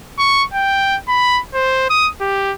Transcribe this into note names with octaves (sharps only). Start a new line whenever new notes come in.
C#6
G5
B5
C5
D#6
G4